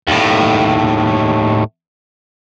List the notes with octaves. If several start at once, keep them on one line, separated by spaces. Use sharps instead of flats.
D#2 A2